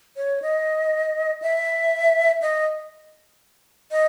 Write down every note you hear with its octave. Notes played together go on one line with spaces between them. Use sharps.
C#5
D#5
E5
D#5
D#5